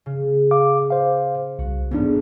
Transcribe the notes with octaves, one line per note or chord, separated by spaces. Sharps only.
C#3
F5 D6
C5 F5
C2 F#4
A1 E2 G#2 B3 D4